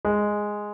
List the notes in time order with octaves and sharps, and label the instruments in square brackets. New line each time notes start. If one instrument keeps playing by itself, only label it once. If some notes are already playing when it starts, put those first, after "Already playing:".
[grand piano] G#3